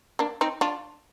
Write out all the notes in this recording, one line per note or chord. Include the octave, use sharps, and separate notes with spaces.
A#3 D4
C4 D#4
D4 F4